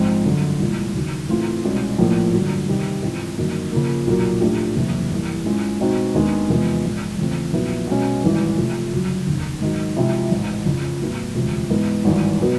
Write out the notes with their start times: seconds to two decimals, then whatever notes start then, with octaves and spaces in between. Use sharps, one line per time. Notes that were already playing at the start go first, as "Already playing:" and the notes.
Already playing: A#1 G#2 F3 G#3 C4
0.25 G1 F#2 D3
0.59 C2 A#2 F3 G#3
0.94 D#2 C#3 F#3
1.29 A2 E3 A3 C4 F4
1.64 C2 B2 G#3 C#4 F#4
1.98 A#1 A2 F3 A#3
2.33 G2 D3 F#3
2.68 C3 D#3 G3
3.02 G#2 E3 G#3 C4 F4
3.37 G1 F#2 D#3 F#3 A#3
3.72 C#3 F3 A#3
4.07 B1 A#2 F#3 A#3
4.41 A2 F3 A3 D4 G4
4.75 F#1 E2 C3 F3 A#3
5.11 A1 G2 E3 G3 A#3
5.45 G#2 E3 G#3 C#4 F4
5.80 B2 G#3 C4 D#4 F#4
6.15 D#2 D#3 G#3 B3 D4
6.50 E2 C3 F3 G#3 B3
6.84 A#1 G#2 F3 G#3
7.18 E2 C#3 F3 A3 C4
7.53 A#1 A#2 F#3 B3 E4
7.87 B2 G#3 C#4
8.23 G#1 G2 E3 G#3
8.57 C3 F3 A3
8.92 G1 F#2 C#3 F#3
9.27 F1 D#2 C#3
9.61 G#2 D#3 F#3
9.97 C3 F3 G#3 C4 E4
10.31 A1 G#2 E3
10.65 F2 C#3 F3
11.01 A2 F#3 B3 E4
11.34 E1 D2 C3 F3 G#3
11.70 G#2 E3 G#3 B3
12.04 G#1 G2 E3 G#3
12.40 B2 F#3 B3